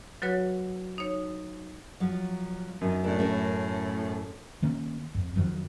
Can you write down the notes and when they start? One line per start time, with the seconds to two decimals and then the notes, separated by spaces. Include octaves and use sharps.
0.22 F#3 F#4 B4 C#5
0.98 D#4 C#5
2.00 F3 F#3
2.81 F#2 D#3
3.04 A2 D4 E4 A#4
3.19 A3 C#4 A#4
4.62 D#3 A#3 C#4
5.15 F2
5.36 F2 D#3 F3 F#3